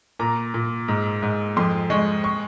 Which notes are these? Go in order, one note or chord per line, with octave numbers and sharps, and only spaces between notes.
A#2 A#5
A#2
G#2
G#2
F2 C6
G#3 C#6
C#6